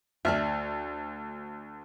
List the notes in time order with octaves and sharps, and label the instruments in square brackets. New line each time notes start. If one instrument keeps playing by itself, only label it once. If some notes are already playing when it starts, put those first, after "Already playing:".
[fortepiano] D2 F6 [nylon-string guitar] D5 E5